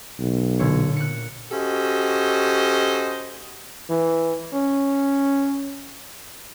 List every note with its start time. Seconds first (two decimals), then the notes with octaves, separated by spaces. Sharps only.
0.19 B1
0.59 A#2 D3 C#5
0.96 F#6 C#7
1.51 C#4 F#4 G4 A4 C5 D#5
3.90 E3
4.53 C#4